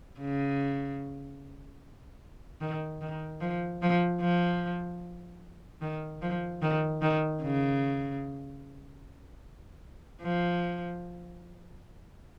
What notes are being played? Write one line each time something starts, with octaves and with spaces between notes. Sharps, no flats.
C#3
D#3
D#3
F3
F3
F3
D#3
F3
D#3
D#3
C#3
F3